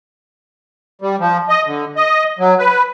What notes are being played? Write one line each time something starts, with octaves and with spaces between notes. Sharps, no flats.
G3
F3
D#5
D3
D#5
F#3
B4